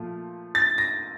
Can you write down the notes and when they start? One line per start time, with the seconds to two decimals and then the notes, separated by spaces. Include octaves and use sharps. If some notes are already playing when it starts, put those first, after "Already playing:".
Already playing: A#2 F3 A3 F4
0.55 A6
0.78 A#6